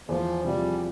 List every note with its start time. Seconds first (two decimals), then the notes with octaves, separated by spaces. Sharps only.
0.08 E2 F3
0.44 C3 F3 G3